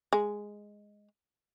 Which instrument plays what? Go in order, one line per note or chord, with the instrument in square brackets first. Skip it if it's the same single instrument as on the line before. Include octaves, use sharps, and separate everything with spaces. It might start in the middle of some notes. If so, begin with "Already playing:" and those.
[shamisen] G#3